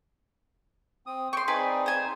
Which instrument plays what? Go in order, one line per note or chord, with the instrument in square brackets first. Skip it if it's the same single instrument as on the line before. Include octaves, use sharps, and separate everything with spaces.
[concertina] C4 D#6
[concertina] G5 [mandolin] C6 C#6
[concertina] C4 D#4 G#4 [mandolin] B4 D5 G#5
[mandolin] C5 G#5